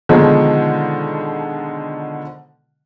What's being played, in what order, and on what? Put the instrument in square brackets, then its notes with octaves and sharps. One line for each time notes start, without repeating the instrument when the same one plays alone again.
[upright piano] B2 D3 D#3 F3 G#3 D#4